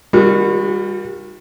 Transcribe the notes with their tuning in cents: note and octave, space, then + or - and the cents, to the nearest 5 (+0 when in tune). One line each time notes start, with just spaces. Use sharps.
D#3 +15 G3 +25 F#4 -30